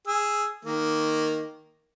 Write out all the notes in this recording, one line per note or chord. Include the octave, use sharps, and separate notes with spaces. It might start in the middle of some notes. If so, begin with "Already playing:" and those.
G#4 E6
D#3 A#3